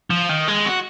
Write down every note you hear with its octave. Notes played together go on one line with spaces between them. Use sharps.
F3
D#3
G#3
F#4